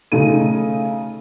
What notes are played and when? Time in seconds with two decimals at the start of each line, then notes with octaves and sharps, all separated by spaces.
0.12 C#3 A3 D#4 A4 D#7